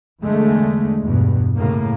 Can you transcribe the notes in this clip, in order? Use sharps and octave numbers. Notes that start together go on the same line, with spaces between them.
E2 D3 G#3 A3
E2 G2 B2
A2 C#3 A#3